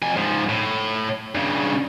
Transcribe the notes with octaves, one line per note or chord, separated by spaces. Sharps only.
F2 G#5
G#2 F3
A2
G2 C#3